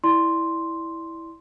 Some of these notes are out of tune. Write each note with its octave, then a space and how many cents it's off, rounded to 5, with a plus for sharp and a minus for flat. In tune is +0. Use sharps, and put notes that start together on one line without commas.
E4 -5 D5 +0 C6 +0